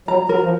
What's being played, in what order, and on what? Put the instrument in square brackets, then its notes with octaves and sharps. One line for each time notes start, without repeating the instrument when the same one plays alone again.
[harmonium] F#3 [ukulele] A#5
[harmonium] F#3 [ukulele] A#4
[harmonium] F3